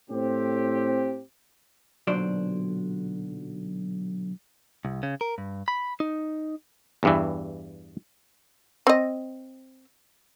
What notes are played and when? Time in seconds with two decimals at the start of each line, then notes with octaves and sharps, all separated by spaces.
0.10 A2 C4 G4
2.07 B1 A#2 D3 F#3 C5 D5
4.85 C2
5.03 C#3
5.21 A#4
5.38 G2
5.68 B5
6.00 D#4
7.03 E2 G2 E3
8.87 C4 D#5